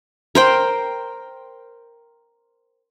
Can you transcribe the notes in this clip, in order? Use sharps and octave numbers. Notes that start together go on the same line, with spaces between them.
A#4 C5 G5